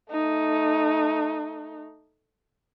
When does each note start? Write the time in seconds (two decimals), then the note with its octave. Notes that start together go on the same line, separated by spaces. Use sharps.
0.11 A3 D#4